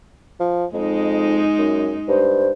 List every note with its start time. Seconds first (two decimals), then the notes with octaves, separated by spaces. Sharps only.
0.40 F3
0.74 F2 G#3 D#4
1.58 F#2
2.08 G2 C5